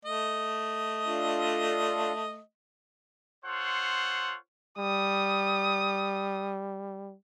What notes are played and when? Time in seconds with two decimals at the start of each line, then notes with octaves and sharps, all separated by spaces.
0.05 A3 D#5
1.06 D4 F4 A4
3.45 F4 A4 C5 C#5 F#5
4.78 G3 D#6